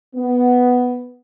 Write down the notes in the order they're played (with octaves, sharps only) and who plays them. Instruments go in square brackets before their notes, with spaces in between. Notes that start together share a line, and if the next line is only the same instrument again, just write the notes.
[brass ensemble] B3